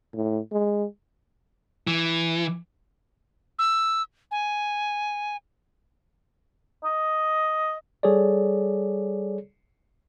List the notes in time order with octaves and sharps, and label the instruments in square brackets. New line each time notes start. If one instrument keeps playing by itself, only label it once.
[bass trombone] A2
G#3
[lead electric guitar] E3
[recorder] E6
G#5
[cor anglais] D#5
[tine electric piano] G3 G#4 A4 C#5 D5